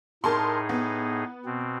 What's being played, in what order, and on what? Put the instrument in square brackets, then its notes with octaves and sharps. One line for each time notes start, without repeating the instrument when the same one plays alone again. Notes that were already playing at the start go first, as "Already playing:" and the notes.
[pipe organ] A2 D#4 G#4 [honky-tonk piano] A#4 A5 C6
[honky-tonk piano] B3
[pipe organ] B2 C4